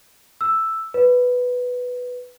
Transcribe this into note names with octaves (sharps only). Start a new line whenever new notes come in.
E6
B4